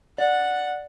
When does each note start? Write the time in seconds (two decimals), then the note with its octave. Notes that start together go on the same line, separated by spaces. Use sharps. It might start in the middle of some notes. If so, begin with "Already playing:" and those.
0.18 D5 F#5